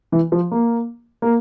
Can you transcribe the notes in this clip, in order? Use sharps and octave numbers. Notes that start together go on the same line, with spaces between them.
E3
F3
A#3
A#3